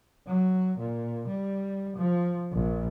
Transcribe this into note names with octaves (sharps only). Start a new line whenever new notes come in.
F#3
A#2
G3
F3
A#1